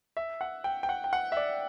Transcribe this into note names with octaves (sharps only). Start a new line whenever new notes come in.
E5
F#5
G5
G5
F#5
G5
F#5
E5
D5